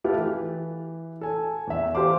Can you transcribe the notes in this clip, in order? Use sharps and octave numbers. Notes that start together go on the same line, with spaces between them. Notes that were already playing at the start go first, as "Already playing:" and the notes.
A3 E4 F4 G4 A4 B4
E3
A4 G#5
E2 E5
G4 C5 F5 C6 D6